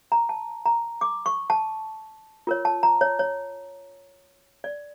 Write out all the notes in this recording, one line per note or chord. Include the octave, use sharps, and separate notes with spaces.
A#5
A5
A#5
D6
C#6
A5
F4 A#4 C#5
A5
A#5
C#5
C#5
D5